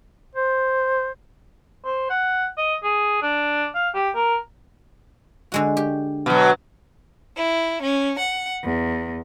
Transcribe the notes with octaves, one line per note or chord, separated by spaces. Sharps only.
C5
C5
F#5
D#5
G#4
D4
F5
G4
A#4
D3 G#3 F#4
G4
B2 F#3
E4
C#4
F#5
E2